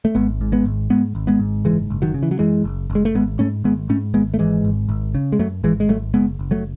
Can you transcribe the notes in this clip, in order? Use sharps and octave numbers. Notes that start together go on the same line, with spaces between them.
A3
G#1 G#3 B3
G#2
G#3 B3
G#1
G#2 G#3 B3
G#1
G#3 B3
G#2
F#1 E3 G#3
F#1
D#3 F#3
C#3
E3
F#3
F#2 E3 G#3
F#1
F#1
G#3
A3
G#1 G#3 B3
G#2 A3 C#4
G#1 G#3 B3
G#2 A3 C#4
G#1 G#3 B3
A3
G#2 E3 G#3
G#1
G#1
C#3
G#3
F#2 F#3 A3
G#1 E3 G#3
G#3
G#1 F#3 A3
F#1 G#3 B3
F#1
F#3 A3